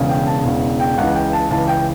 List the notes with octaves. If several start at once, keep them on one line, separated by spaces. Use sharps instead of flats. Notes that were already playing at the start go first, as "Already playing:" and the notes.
Already playing: E1 E2 C#3
G5
A5
E1 E2 C#3
G5
C#2 C#3 E3 F#5
G5
A5
C#2 C#3 E3 A5
G5